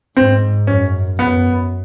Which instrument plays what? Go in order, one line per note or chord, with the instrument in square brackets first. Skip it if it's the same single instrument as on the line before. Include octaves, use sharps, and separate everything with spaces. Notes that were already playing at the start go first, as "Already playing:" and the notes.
[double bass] G#2 [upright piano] C4
[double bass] F#2 [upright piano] C#4
[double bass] F#2 [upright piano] B3